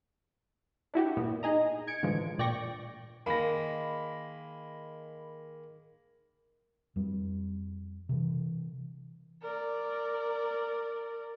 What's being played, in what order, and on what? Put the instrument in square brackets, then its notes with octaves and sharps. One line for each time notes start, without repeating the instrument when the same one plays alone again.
[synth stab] D4 E4 F#4 G4
A#2 B3
D#4 G#4 D#5 A#5
G#6 C#7 D7
A2 D3 E3 F3 G#3
A#2 D5 G5 C#6 A#6
[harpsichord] D#3 G#3 A#3 [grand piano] B5 A#6
[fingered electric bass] F2 G3
C3 E3
[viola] A#4 D5